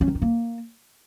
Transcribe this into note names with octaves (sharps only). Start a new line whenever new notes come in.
C#4
D#3
D#4
A#3